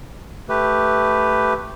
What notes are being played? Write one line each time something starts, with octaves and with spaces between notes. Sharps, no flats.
A3 G4 B4